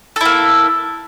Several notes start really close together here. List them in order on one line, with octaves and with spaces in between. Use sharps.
A4 E4 A#3